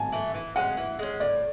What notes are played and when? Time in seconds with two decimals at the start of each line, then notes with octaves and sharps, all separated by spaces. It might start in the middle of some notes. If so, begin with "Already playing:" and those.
Already playing: G#5 A5
0.12 E3 A3
0.34 E3
0.56 G#3 C#4 F#5
0.77 E3
0.99 G#3 C#4
1.20 A2 D5